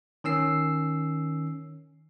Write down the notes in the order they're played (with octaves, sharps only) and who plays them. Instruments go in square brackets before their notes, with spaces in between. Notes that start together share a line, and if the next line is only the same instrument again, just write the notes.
[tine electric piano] D#3 C#4 E6 C7